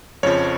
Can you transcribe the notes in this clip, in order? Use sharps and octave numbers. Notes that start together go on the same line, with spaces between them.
F2 C#3 F3 C#5